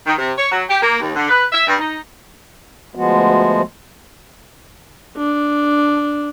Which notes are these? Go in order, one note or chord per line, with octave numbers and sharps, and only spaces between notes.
D#3
C3
C#5
F#3
G4
A#3
D#2
D3
B4
E5
G2
D#4
D2 F3 G#3 B3 F#4
D4